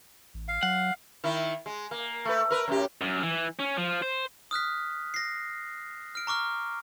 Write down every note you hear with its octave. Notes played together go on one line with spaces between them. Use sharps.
A1
F5
F#3 F#5
D#3 E4
G#3
A#3
A3 B4
A#4 B4
F#2 A2 G4
F#2
E3
C#4
F3
C5
D#6 F6 F#6 B6
A#6 C7
F6 D7
A#5 C#6 D6 F6